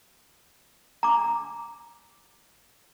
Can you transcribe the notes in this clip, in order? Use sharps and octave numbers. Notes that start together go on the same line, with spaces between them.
A#5 D6